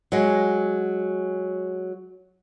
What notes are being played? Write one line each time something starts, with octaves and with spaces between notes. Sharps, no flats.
F#3 G#3